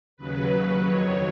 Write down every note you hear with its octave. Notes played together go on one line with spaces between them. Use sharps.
D#2 C#3 F#3 B4
F2 D#3 F#3 C#5